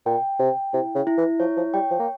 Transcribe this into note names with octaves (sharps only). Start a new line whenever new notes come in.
A#2 G5
C3 G5
C3 E4
C#3
E4
E3
F3 C#5
F3
G3 G5
F3
A#3